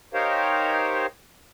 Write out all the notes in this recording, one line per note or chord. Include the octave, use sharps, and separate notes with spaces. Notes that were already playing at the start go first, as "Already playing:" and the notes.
D#4 G4 A#4 C5 C#5 F5